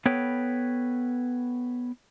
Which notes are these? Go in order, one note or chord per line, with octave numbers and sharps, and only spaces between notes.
B3 A4 B4 C#5 G5